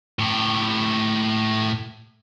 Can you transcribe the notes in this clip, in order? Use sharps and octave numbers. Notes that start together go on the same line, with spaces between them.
A2 G4